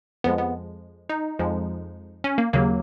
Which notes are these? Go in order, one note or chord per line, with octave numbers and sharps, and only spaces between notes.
F2 F3 G#3 B3
B3
D#4
F2 F3 G#3
C#4
A#3
D#2 C#3 F#3 A#3